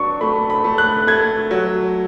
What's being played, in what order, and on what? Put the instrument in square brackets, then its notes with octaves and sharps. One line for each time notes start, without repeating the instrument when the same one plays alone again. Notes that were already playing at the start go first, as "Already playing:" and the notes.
Already playing: [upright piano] F#3 D4 [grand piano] C#6
[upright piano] A3 [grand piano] B5
[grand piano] B5
[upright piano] A3
[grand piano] F#6
[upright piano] A3 [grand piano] G#6
[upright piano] F#3